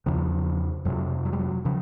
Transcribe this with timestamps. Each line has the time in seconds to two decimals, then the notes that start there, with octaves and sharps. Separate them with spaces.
0.06 E2 C#3 F3
0.85 F2 C3 F#3
1.25 F#3
1.33 G3
1.39 F#3
1.65 C#3 F3